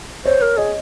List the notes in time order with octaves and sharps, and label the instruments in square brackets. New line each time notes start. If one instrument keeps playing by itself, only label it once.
[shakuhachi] C5 [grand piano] C#5
[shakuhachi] A#4
[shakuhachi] G#4 [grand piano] D#5